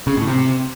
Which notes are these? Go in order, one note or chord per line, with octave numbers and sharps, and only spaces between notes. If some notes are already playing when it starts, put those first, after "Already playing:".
C#3
A2
C3